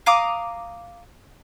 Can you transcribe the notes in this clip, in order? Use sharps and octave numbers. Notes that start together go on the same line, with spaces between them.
F5 A#5 D6 D#6